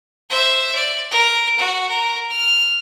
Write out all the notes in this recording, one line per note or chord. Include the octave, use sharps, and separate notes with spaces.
C5 E5
D5
A#4
F#4
A#4
F6